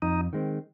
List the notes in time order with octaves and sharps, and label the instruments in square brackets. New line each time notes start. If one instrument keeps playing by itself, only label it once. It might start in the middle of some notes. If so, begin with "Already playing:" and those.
[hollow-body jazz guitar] F2 [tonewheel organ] D#4
[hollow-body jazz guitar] D#3 G#3 C4